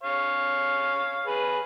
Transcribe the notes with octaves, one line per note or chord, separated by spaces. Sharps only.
C#5 F5
G#4 B4